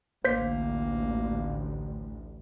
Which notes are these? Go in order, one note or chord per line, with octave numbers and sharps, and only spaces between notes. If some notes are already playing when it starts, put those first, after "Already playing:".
A1 D2 A#3 C5 G6 B6